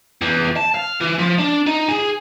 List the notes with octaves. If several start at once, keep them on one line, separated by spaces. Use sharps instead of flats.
E2
A5
F5
E3
F3
D4
D#4
G#4